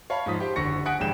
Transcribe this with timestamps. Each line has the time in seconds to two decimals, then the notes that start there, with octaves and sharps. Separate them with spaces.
0.10 C#5 F5 A5 B5
0.26 G#2 F3 D#6 B6
0.40 G4 C5 G5
0.56 F#1 D3 C#6 A#6 C#7
0.86 F#5 G#5 D#6 F#6 B6 D7
1.00 A1 G2 G#4 G5 G6 E7